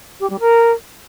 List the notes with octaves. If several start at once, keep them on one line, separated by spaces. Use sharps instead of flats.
G4
G3
A#4